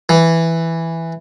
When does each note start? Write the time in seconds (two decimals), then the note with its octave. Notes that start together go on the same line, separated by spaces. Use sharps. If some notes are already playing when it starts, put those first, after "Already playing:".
0.09 E3